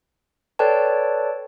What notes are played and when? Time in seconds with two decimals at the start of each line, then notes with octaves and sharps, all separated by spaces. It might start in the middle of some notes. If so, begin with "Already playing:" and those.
0.59 A4 B4 C#5 D5 G5 A5